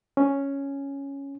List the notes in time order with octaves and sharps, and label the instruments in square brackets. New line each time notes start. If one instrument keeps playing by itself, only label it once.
[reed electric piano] C#4